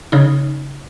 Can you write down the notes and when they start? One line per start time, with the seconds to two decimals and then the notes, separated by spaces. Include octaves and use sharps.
0.12 C#3 D#4